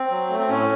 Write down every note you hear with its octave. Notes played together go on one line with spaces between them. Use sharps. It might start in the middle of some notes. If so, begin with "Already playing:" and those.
Already playing: C4
F#3
A3
C4
A2 C#4